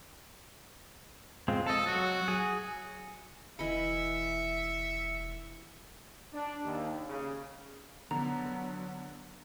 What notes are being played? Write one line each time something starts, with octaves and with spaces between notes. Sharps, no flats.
G#3 C4 F4
A4 D#5 A5
F#3 F#4
G#4 G#5
E1 E3 D#5 E5 B5 C#7
D4
D#2
C#3
D3 F#3 B3 A#5